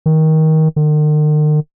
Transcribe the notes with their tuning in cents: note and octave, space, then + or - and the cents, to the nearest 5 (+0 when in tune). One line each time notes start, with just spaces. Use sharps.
D#3 +20
D#3 -45